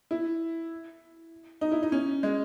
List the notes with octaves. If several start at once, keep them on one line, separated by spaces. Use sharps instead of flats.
E4
D#4
E4
D#4
C#4
G#3